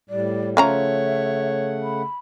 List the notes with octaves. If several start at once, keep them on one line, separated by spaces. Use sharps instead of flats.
A2 G3 D5
C#3 F3 A3 C#4 C#5 E5 F#5 A#5
B5